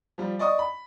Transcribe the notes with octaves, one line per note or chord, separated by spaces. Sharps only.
F3 G3
D5 D#5 C#6 D#6
B5